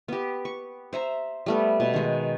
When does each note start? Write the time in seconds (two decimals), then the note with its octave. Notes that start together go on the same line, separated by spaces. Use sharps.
0.08 B3 G4
0.45 C#6
0.93 C5 E5 A#5
1.46 G3 A3 B3
1.80 B2
1.93 D#3 G#3